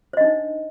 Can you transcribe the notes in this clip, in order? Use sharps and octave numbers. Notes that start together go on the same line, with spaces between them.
D4 D#4 C5 D#5